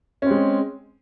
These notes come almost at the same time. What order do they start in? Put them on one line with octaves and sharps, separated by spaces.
C#4 C4 G#3